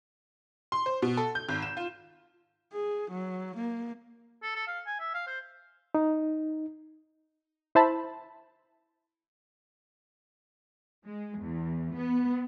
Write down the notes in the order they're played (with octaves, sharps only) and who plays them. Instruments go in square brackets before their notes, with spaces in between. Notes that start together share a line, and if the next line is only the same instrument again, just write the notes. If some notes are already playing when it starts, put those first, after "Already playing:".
[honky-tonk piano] C6
C5
B2
A4
G6
G#1
E7
F4
[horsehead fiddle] G#4
F#3
A#3
[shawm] A4
A4
F5
G#5
E5
F5
C5
[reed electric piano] D#4
[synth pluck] E4 C5 E5 A5 B5
[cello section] G#3
E2
B3